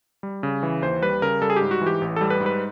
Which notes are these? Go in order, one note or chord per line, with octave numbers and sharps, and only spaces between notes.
G3
C#3
E3
D#2 C5
G3 B4
C#3 A#4
G3 A4
G#4
G#2 G4
F#4
E3
G4
A1
G3 A4
B4
G#2
B4